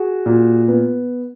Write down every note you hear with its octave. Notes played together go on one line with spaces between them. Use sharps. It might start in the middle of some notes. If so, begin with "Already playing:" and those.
Already playing: F#4 G#4
A#2
B3